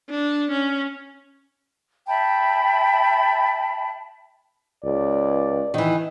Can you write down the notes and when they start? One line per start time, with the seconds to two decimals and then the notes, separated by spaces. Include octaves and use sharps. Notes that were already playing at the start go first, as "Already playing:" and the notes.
0.10 D4
0.51 C#4
2.08 E5 G5 A5 B5
4.84 C#2 D5
5.74 D#3 E3